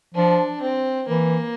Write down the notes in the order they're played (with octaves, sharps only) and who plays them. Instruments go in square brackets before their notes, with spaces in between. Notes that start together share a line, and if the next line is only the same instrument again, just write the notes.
[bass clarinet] F3 [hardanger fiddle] D4
[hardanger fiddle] C4
[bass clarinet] E3 [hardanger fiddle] A#3